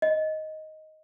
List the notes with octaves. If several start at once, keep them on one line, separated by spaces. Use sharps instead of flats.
D#5